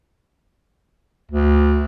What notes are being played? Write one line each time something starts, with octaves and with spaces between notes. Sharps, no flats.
D2